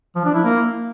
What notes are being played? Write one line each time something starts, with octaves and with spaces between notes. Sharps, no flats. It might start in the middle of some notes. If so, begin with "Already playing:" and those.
F3
D4
E4
A#3